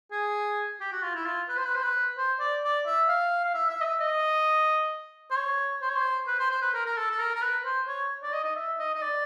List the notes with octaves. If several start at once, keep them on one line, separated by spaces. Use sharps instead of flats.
G#4
G4
F#4
F4
E4
F4
B4
C5
B4
C5
B4
C5
D5
D5
E5
F5
F5
E5
E5
D#5
E5
D#5
C5
C#5
C5
C#5
C5
B4
C5
C5
B4
A#4
A#4
A4
A4
A#4
A#4
B4
C5
C#5
D5
D#5
D#5
E5
D#5
D#5
D5